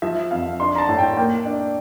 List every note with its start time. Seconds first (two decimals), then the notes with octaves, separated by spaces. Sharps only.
0.02 F3 E5
0.31 F2 F5
0.60 D4 C6
0.75 A#5
0.78 A5
0.89 A2
0.98 G5
1.17 A#3 G5
1.46 D4